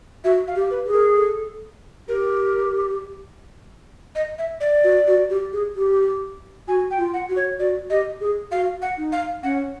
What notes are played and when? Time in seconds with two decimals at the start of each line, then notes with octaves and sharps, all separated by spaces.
0.24 F#4 E5
0.48 F5
0.55 G4
0.71 B4
0.86 G#4
0.93 A#4
1.16 A4
2.08 G4 A#4
4.15 D#5
4.38 E5
4.60 D5
4.84 F#4
5.07 F#4
5.30 G4
5.53 G#4
5.76 G4
6.68 F#4 G#5
6.91 G5
6.98 F4
7.14 F#5
7.29 F#4
7.36 C#5
7.59 F#4 D5
7.90 G4 D#5
8.21 G#4
8.51 F#4 F5
8.82 F#5
8.98 D#4
9.12 F5
9.43 C#4 F#5